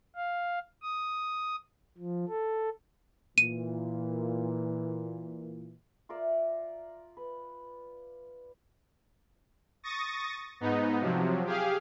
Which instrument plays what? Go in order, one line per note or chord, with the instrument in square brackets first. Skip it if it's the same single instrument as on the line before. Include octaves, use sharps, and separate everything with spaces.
[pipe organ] F5
D#6
F3
A4
[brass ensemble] A#2 E3 [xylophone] D#7
[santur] F4 A#4 D5 E5
B4
[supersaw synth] C#6 D#6 A6 A#6
G#2 B3 D#4
C3 F3 F#3
G4 G#4 F5